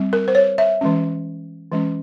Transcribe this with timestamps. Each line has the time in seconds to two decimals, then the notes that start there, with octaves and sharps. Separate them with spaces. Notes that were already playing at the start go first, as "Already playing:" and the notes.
Already playing: G3 C4
0.13 A#4
0.28 C5
0.35 C#5
0.58 E5
0.81 E3 G#3 C#4
1.72 E3 G#3 C#4